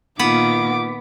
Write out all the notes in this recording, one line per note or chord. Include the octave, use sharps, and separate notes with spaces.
A#2 D#3 B3 F4 D6